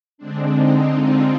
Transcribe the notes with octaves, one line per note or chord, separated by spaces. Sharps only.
D3 G#3 C4 D4
D#4
D4 F4